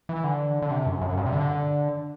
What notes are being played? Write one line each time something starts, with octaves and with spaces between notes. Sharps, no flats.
E3
D3
D3
C3
F#2
F#2
G2
C3
D3